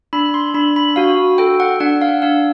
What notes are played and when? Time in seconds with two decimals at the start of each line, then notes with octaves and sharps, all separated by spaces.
0.13 D4 B5
0.34 C6
0.54 D4 B5
0.76 B5
0.96 F#4 F5
1.38 A4 G5
1.60 F#5
1.80 D4 F#5
2.01 F5
2.22 D4 F5